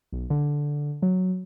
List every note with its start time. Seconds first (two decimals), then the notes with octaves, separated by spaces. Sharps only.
0.12 B1
0.30 D3
1.02 F#3